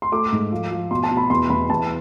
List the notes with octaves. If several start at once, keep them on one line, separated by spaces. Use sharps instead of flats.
C6
A3 D6
G#2
F3
F3
B2 C6
A5
B2
B5
E2 C6
E2 B5
E2 A5